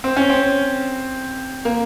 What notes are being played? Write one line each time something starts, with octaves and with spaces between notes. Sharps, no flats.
C4
C#4
C4
A#3